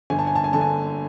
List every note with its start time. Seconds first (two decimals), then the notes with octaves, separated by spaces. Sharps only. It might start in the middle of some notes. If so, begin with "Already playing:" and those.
0.10 G1 G#5
0.19 A5
0.27 G#5
0.35 A5
0.44 G#5
0.53 D3 A5
0.61 G#5